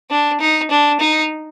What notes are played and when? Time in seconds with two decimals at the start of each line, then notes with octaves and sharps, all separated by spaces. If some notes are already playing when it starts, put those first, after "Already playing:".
0.10 D4
0.40 D#4
0.70 D4
1.00 D#4